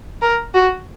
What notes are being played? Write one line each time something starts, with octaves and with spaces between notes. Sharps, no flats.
A#4
F#4